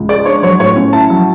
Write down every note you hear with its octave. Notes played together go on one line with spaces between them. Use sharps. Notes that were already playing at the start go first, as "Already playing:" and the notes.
Already playing: C#2
G#3 D5
D4 C#5
F#3 C#5
A2 C#5
C#4
E4 A5
F#3